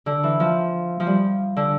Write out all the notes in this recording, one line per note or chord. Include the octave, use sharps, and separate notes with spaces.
D3
E3
F3
F3
G3
D3